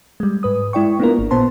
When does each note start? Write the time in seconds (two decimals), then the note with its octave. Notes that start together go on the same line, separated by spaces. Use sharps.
0.20 G3 G#3
0.43 G#2 B4 D#6
0.73 G#3 E4 D5 G5 C#6
1.00 A#3 B3 D4 E4 F4 A#4
1.19 G#1
1.31 A#2 A#3 B3 C5 A5 C6